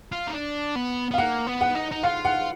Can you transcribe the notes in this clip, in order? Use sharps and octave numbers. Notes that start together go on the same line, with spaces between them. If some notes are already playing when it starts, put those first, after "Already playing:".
F4
D#4
D4
B3
B3
F5
A#3 F#5
B3
F#5
D#4
D#4
F4 F5
F#5